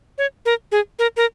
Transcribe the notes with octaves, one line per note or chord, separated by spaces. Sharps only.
C#5
A#4
G#4
A#4
A#4